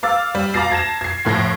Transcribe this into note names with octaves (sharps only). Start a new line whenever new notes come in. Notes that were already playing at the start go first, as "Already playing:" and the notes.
F5 D6 E6 F6 A6
G3
F5 A#5 D6 A6 A#6 C7
A5 G#6 A#6 E7
G#6 C7
F1 A2 G#6 A#6